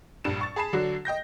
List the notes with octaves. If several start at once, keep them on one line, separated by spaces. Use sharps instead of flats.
A#1 G2 E7
C#6 A6
G#4 A5 B5 C7 E7
D3 F#3 D4 F#4
D#5 G5 G6 A#6